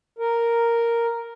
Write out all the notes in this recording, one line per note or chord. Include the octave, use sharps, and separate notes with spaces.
A#4